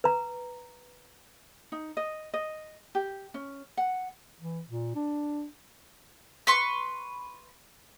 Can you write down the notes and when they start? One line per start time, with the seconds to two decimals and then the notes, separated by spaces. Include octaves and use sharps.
0.04 B4 A#5
1.72 D#4
1.97 D#5
2.34 D#5
2.95 G4
3.34 C#4
3.77 F#5
4.40 E3
4.69 A#2
4.95 D4
6.47 B4 C6 C#6